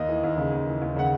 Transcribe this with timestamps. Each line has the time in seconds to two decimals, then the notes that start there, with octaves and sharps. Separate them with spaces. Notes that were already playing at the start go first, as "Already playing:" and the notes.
Already playing: D#2 D#5
0.09 E3
0.24 D#2
0.38 C#3
0.52 D#2
0.67 E3
0.82 D#2
0.96 C#3 F#5